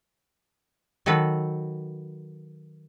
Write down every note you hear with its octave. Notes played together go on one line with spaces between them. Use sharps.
D#3 F#3 A4 B4